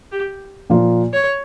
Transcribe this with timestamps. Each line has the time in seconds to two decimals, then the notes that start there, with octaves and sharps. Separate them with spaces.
0.12 G4
0.70 A#2 F3 A#3 F4
1.13 C#5